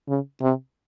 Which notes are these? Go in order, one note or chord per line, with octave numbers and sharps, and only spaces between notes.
C#3
C3